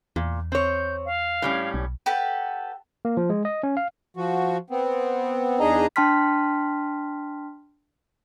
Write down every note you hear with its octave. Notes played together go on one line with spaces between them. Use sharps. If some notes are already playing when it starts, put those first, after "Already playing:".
E2 A#2
C4 C#5 G6
F5
A2 G3 C#4
B1
G4 A4 B4 F#5
A#3
F3
G#3
D#5
C#4
F5
F3 F#4
B3 C4
E2 D4 D#4 G#4 D#5 A#5
D4 G5 A5 C6 F6 B6